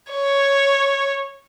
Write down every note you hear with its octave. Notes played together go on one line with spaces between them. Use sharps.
C#5